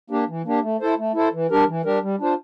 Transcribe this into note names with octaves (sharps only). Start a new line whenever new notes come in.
A#3 D4 G4
E3
A#3 D4 G4
A3
E4 A4 C5
A3
E4 A4 C5
E3
G3 D4 G4 A#4
E3
G3 D4 G4 A#4
G3
D4 F4 C5